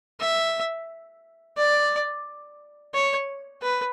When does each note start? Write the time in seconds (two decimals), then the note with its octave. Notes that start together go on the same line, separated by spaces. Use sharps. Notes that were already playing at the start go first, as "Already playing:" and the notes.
0.20 E5
1.57 D5
2.94 C#5
3.62 B4